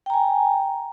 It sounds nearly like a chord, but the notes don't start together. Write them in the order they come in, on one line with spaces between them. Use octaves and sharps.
G5 A#5 G#5